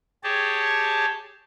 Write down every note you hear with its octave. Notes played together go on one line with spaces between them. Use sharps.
G4 G#4 C#5 A5